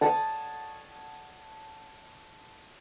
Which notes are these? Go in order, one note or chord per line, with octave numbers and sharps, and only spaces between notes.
C#5 F#5 A5 D#6